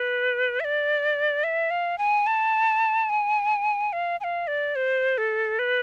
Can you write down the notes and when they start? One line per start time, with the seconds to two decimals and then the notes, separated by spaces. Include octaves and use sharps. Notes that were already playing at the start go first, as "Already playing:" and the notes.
Already playing: B4
0.60 E5
0.64 D5
1.44 E5
1.70 F5
1.98 G#5
2.27 A5
3.09 G#5
3.93 F5
4.20 G#5
4.24 F5
4.47 D5
4.75 C5
5.18 A4
5.59 B4